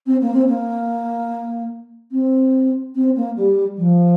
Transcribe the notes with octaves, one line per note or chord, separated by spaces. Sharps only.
C4
A#3
C4
A#3
C4
C4
A#3
G3
F3